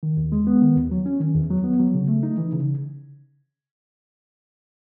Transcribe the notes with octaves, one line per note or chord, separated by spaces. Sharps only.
D#3
D#2
G#3
B3
D#3
D#2
F#3
C#4
D#3
E2
F#3
B3
F#3
C#3
A3
D#4
E3
C#3